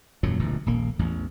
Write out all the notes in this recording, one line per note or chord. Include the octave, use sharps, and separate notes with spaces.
D#1 F#2 A#2 F#3
E1 D2 A#2 E3
D#1 A#1 A#3
A1 E2